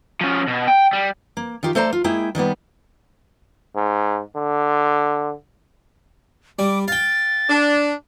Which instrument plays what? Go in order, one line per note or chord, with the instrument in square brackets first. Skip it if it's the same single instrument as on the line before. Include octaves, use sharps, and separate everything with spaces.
[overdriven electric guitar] F3 C#4
B2
G5
G3
[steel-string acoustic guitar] A#3
D#3 F4 G4 A#4
A3 A4 C5 D5 A#5
F4
G#3 A#3 E4 G#4 G5
D#3 G3 A#3 B3
[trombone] G#2
D3
[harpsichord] G3 [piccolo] D6
[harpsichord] F5 G5 [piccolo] A6
[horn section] D4